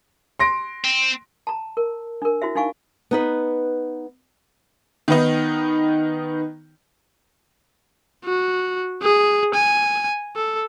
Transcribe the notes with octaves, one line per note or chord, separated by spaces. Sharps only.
C6 A#6 D7
C4
A5 A#5
A#4
D4 A#4
E4 F#4 C5 E5
D4 D#4 F5 G#5 C#6
B3 D#4 B4
D#3 B3 D#4
F#4
G#4
G#5
A4